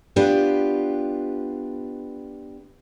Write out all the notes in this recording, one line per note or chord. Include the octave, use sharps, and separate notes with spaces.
B3 D4 F4 G4 B4